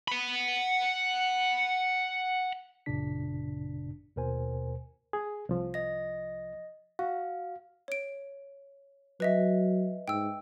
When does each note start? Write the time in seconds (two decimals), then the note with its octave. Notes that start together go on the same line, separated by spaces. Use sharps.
0.08 F#5 B5
2.86 G#1 F#2 A#2 C#3 D4 B6
4.16 D#2 B2 A#4 C5 G#5
5.13 G#4
5.49 C2 F3
5.74 D#5 A#6
6.99 F#4 F5
7.88 C#5 D7
9.20 F#3 B4 D#5 E5
10.08 G#2 G5 E6